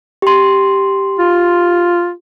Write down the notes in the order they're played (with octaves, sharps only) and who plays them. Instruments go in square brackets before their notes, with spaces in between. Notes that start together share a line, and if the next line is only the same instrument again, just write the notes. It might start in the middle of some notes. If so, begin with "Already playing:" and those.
[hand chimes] G4 C6
[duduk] F4